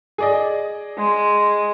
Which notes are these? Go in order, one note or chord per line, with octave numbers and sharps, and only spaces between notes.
G#4 D5 D#5
G#3